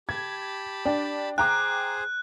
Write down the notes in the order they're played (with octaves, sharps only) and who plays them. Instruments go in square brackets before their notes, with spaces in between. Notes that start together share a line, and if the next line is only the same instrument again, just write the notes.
[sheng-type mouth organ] G4 A5 B5 [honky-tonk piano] G#6
[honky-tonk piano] D4 G5
[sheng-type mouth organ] G#4 C5 [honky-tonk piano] G5 A#5 D6 [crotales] F#6